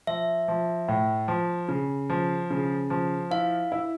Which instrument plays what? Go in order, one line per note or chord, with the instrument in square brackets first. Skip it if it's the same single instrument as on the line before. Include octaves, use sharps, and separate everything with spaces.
[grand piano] F3 [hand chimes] E5
[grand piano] F3
A2
F3
C#3
F3
C#3
F3
[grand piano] E4 [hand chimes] F5
[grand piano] E4